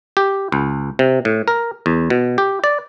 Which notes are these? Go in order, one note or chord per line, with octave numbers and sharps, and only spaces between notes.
G4
C#2
C3
A2
A#4
E2
B2
G4
D5